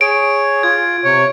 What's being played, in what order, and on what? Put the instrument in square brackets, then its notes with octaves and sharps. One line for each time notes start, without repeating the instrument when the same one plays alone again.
[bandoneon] G#4 C#5 [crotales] D7
[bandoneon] F4 [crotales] G#6
[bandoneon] C3 [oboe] C#5